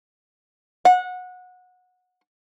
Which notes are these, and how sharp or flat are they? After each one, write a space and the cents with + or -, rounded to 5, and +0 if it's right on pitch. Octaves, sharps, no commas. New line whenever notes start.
F#5 -20